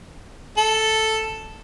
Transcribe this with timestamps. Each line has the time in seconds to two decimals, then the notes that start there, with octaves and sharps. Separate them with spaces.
0.57 A4